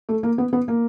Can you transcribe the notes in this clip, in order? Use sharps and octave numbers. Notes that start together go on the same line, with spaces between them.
A3
A#3
B3
B3
A#3